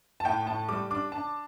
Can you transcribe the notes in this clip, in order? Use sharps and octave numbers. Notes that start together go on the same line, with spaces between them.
A5
A2 G5
A2 A5
G3 D6
D4 D6
D4 A5